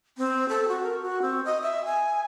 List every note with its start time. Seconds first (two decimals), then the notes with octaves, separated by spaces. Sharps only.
0.18 C4
0.49 A4
0.68 F#4
0.83 A#4
1.02 F#4
1.22 C4
1.45 D#5
1.62 E5
1.86 G#5